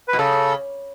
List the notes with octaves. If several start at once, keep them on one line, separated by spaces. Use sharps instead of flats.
B4
B2
C#3 A4